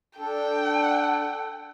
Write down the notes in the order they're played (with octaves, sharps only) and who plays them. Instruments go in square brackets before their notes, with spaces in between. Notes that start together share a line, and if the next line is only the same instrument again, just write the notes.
[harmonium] D4 A4 [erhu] G5